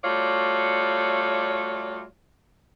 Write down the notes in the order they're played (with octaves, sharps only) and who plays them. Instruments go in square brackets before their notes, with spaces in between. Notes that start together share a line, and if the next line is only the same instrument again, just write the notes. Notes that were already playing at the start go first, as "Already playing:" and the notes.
[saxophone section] G3 A3 F4 F#4 C#5 D5